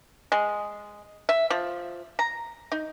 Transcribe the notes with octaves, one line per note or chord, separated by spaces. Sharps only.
G#3
E5
F3
A#5
D#4